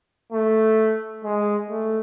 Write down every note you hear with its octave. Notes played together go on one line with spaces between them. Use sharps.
A3
G#3
A3